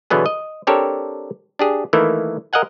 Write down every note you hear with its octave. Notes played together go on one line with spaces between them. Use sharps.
B2 D3 E3 F#3 B3 G#4
D#5
C4 D4 G4 A4 A#4 C#5
D4 G4 G#4
D#3 E3 A3 A#3 E4
A#4 D#5 F5 F#5 G#5